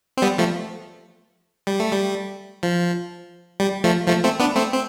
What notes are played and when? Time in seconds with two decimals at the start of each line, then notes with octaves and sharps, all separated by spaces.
0.17 C4
0.22 G3 B3
0.38 F3 A3
1.67 G3
1.80 A3
1.93 G3
2.63 F3
3.60 G3
3.84 F3 A3
4.08 F3 A3
4.24 A3 C4
4.40 B3 D4
4.56 A3 C4
4.72 C4